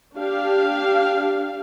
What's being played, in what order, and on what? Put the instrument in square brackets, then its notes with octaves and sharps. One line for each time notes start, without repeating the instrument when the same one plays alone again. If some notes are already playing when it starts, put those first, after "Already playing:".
[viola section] D4 G4 F5